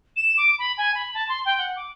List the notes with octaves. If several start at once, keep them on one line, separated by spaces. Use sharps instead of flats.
E7
D6
B5
G#5
B5
A5
C6
G5
F#5
D6